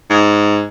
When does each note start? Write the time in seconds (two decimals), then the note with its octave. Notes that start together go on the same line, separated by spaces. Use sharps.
0.10 G#2